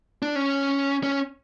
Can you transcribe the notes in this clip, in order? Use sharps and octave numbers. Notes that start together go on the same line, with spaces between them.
D4
C#4
C#4